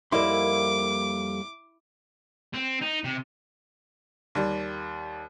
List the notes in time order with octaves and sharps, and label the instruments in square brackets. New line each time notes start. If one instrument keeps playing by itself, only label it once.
[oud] F2 A#3 D5 [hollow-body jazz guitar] G3 D#5 C6 [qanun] E4 [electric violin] D6
[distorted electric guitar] C4
D#4
C3
[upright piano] D#2 G3